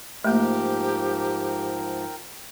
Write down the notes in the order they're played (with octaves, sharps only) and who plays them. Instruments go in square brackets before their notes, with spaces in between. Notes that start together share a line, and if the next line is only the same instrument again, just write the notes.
[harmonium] G#2 F3 [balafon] A3 A#3 [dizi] G4 [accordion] A#4 G5